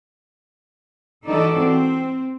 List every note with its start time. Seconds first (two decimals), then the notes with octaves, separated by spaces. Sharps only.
1.27 E3 G#3 D#4 F#4 A4 D5
1.59 C4